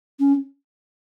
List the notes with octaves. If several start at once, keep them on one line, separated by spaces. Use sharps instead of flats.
C#4